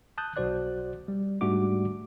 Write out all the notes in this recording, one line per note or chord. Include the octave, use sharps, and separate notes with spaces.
A5 D#6 F#6 G6
B1 F#4 C5 D5 F#6
G3
G#2 G3 A3 D4 F#4 D6